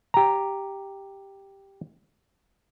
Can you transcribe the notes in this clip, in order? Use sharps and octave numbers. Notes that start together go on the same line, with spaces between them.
G4 A#5